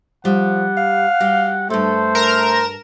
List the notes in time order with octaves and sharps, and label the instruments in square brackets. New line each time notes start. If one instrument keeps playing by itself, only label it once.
[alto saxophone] F3 [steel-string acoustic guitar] G3 [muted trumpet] F#5
[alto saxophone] F5
[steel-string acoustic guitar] G3 F#4 G4
[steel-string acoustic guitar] G2 A4 [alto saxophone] A3 [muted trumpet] C5
[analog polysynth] A#4 A#5 E7